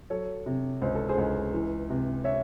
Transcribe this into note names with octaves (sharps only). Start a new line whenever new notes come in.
F#3 A4 C#5
C3
C#2 C5
A4
G#4 C5
C#2
E3
C3
C#5 E5